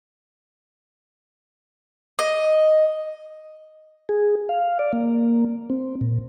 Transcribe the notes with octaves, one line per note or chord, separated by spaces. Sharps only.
D#5
G#4
F5
D5
A#3
C4
A#2